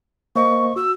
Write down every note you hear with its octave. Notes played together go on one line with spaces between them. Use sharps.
A#3 C5 D#5 C#6
F#4 E6